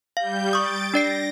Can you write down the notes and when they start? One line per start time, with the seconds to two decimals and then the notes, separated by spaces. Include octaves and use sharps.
0.17 G3 F5 G6
0.53 C#6 D#6 A6 D7
0.94 D4 D5 A#6 C7